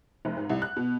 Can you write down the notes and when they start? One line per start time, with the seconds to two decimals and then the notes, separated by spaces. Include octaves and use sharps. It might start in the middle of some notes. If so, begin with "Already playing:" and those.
0.25 F1
0.37 G#2
0.50 C2
0.62 F#6
0.76 B2